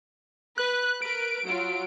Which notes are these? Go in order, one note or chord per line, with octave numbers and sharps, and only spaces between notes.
B4 F#6
A#4 B4 D7
F#3 F4